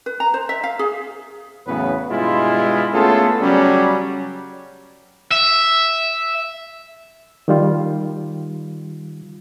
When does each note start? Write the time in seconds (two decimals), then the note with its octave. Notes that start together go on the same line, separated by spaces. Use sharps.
0.06 B4
0.20 A#5
0.34 C5
0.49 E5
0.64 F5
0.79 G#4
1.66 E2 A2 C#3 F#3 B3 B4
2.09 G2 B2 G#3 E4 F4
2.93 A3 B3 C#4 F4 G#4 A4
3.40 C#3 F#3 G3 C#4
5.31 E5
7.48 D#3 G3 F4